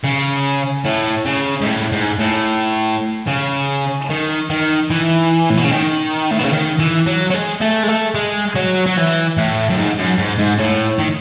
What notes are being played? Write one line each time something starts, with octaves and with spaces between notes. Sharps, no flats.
C#3
A2
C#3
G#2
A2
G#2
A2
C#3
D#3
D#3
E3
A2
B2
C#3
D#3
A2
B2
C#3
D#3
E3
F#3
F#3
G#3
A3
G#3
A3
G#3
F#3
F#3
E3
A2
F#2
G#2
F#2
G#2
G#2
A2
D#3